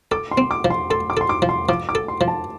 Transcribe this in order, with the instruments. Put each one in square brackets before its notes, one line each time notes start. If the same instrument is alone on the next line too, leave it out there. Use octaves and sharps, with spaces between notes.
[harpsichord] A4 [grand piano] D6
[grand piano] C6
[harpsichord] C4
[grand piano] D6
[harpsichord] F3
[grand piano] C6
[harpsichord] A4 [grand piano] C6
[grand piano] D6
[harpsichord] A4 [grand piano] C6
[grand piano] D6
[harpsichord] F3
[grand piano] C6
[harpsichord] F3 [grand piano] D6
[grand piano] D6
[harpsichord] A4
[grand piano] C6
[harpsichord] F3
[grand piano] A5